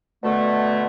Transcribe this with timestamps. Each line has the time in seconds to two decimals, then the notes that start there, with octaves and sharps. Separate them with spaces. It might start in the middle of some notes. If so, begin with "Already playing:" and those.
0.23 B2 D3 A3